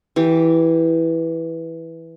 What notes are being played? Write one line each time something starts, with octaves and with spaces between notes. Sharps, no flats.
E3 G4